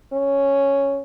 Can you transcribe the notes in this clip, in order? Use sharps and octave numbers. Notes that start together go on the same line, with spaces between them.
C#4